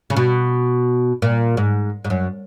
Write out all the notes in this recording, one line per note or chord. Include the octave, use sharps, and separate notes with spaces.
C#3
B2
A#2
G#2
G#2
F#2